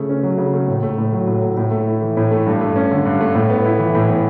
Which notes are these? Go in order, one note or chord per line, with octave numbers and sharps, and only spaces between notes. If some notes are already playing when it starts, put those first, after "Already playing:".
Already playing: C#3 A3
C#4
F#3
C#3
A3
A2
A3
A2
F#3
A2
A3
A2
A3
E4
E3
A2
A3
G2
A3
C#4
D3
G2
A3
A2
B3
E4
E3
A2
B3